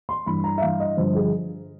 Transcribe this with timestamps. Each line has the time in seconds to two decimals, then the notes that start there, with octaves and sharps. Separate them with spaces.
0.09 C6
0.26 G2 E3 B5
0.44 A#5
0.58 E5
0.61 G2 E3 F5
0.80 D#5
0.97 G2 D3 F3 C5
1.15 G#4